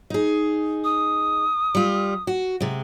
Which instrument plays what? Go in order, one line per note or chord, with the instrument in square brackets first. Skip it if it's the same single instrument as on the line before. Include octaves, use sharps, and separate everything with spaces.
[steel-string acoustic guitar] D#4 G#4
[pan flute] D#6
[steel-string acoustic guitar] G3 F4
F#4
C3 G#3